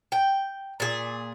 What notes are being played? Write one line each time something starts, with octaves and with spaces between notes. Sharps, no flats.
G5
A#2 G#4